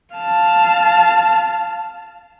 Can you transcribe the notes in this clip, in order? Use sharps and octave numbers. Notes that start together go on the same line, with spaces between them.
F5 A5